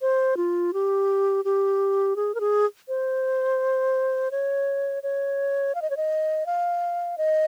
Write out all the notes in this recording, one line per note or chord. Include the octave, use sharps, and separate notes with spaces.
C5
F4
G4
G4
G#4
A#4
G#4
C5
C#5
C#5
F5
D#5
C#5
D#5
F5
D#5